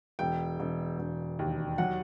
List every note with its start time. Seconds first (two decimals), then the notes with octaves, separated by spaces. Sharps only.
0.19 E1 G5
0.60 E1
0.99 E1
1.39 D#2
1.78 F#3 F#5